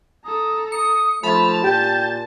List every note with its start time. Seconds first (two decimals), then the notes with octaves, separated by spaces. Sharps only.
0.25 A4 A#5 D#6
0.72 D#6 C#7
1.24 F3 A3 A5 B5 A6 F7
1.64 A#2 G4 G6